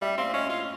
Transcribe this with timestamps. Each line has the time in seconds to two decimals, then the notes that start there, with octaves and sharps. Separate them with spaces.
0.02 G3 E5
0.17 C4 F5
0.33 C#4 D#5
0.49 F4